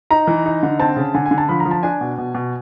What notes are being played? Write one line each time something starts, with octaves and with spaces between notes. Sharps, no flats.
D#4 A#5
E3
D#4
D3
C4 A5
C#3
D3 G#5
G#5
D3
A5
F3 B5
A#5
F3
A5
D4 G#5
B2
B2
B2